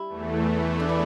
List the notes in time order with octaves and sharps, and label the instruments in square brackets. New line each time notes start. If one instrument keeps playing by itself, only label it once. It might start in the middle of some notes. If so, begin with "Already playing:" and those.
Already playing: [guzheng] G3 E4
[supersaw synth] E2 E3 A3
[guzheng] D4
E4